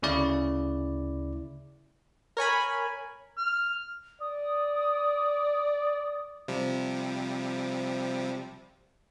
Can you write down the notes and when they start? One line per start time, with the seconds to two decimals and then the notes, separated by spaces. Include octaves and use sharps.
0.02 D2 C#3 E4 D5
2.37 A#4 C#5 G#5 B5
3.38 F6
4.21 D5 D#6
6.48 C3 F3 G3